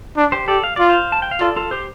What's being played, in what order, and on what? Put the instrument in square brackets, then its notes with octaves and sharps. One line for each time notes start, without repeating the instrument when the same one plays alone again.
[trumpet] D4
[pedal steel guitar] G4 C5
[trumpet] G4 [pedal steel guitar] A4 D5
[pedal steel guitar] F5
[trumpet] F4 [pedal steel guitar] D5
[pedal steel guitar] C5 F5
A5
G5
F5
[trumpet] F4 [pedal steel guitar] A4 D5
[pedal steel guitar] F4 A4
G4 C5